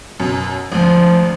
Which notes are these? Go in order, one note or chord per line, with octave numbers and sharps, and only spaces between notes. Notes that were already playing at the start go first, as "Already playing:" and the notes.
F#2 B2
G#1 D2 F3